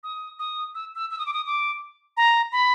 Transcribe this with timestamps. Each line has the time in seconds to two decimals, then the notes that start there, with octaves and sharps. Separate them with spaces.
0.04 D#6
0.39 D#6
0.75 E6
0.96 E6
1.11 E6
1.19 D#6
1.26 D6
1.34 D#6
1.46 D6
2.17 A#5
2.52 B5